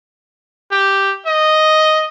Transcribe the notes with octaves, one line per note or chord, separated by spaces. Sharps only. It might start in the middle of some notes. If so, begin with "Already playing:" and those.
G4
D#5